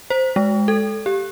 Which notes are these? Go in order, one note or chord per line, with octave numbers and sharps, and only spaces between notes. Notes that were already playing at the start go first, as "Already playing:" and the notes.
C5
G#3
A4
G4